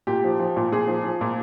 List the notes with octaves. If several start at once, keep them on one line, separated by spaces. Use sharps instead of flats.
A#2 G4
F3
F3
A#2
A#2 G#4
F3
F3
A#2